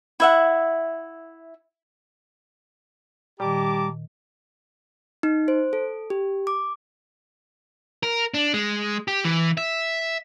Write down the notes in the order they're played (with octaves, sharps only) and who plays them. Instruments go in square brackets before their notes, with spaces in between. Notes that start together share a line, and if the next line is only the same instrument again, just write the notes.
[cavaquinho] E4 E5 F#5
[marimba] A#2 D#3 [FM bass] G3 [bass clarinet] G4 [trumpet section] A5 A#5 D6
[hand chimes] D#4
C5
A4
G4
D6
[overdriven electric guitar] A#4
D4
G#3
G4
E3
E5